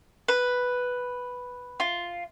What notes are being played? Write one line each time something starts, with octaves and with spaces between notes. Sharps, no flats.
B4
F4